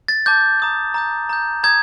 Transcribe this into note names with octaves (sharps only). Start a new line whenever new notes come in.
A6
A5 D6 G6
A#5 D#6 G6
A#5 D#6 G6
A#5 D#6 G6
A#5 D#6 G6 G#6